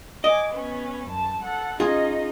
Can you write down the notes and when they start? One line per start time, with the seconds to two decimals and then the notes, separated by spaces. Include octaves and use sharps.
0.24 D#5 G#5 D6
0.53 B3 C#4
1.08 F#2 A5
1.43 A4 F#5
1.80 C#4 D#4 F4 G#4 D#5